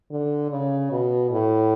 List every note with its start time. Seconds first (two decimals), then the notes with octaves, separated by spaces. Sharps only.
0.11 D3
0.51 C#3
0.91 B2
1.31 A2